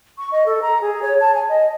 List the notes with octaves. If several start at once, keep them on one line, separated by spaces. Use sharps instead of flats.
C#6
D#5
A4
A#5
G#4
C#5
A5
G#5
D#5